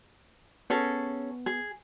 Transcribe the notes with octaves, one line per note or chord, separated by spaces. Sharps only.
B3 C#4 G#4 A4
G#4